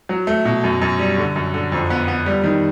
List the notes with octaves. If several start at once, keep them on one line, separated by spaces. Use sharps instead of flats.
F#3
A3
B2
F#2
F#2
G3
D3
F#2
D3
F2
B3
B3
G3
D#3